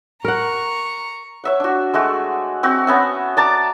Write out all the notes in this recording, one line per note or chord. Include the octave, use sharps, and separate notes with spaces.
A#4 F#5 A#5 C#6
C#5 E5 F#5
D4 F#4
G#3 A3 F#4
C4 F#4
B3 C#4 E5
D5 A5 A#5 D6